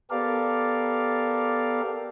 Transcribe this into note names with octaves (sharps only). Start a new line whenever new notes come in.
B3 G4 A4 A#4 D5 F5